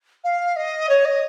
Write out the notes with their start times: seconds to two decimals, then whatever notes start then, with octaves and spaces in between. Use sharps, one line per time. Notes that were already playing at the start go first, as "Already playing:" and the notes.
0.24 F5
0.56 D#5
0.89 C#5
1.05 D#5